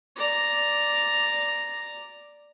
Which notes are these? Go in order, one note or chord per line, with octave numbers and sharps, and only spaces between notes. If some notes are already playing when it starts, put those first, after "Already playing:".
D5 A#5